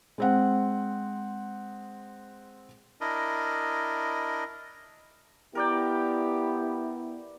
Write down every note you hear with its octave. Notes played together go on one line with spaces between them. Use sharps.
G#3 C4 F#5
D4 E4 A#4 D#5
B3 E4 G4 A#4 D5 G5